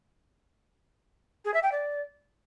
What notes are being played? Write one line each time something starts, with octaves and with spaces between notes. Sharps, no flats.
G#4
E5
G5
D5